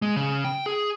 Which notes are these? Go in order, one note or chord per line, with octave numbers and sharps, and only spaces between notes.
G#3
C#3
G5
G#4